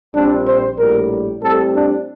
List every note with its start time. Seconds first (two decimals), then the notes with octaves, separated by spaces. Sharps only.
0.14 A#1 A#2 G3 C4 D4
0.47 C5
0.78 A#1 A2 G3 A#4
1.42 A2 G3 C4 A4
1.74 D4